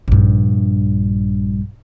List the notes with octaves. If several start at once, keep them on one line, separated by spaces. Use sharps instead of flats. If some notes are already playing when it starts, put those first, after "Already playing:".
A#1 G2